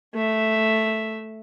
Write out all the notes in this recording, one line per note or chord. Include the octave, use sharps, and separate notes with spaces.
A3 E5